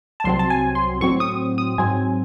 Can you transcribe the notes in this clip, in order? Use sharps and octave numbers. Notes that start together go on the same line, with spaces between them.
A5
C2 C3 F#3 C4 C6
A5
G#5
C6
A2 F#3 C4 C#6
D#6
D#6
G#2 F#3 C4 G#5